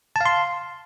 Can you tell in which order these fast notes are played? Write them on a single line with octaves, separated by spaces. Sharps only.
A5 F5 C6